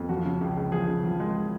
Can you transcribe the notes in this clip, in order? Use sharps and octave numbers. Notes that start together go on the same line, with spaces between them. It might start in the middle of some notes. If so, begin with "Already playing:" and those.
Already playing: F2
F3 F#4
C#3
C#2
C#2
F3 G#4
C#3
F3
G#3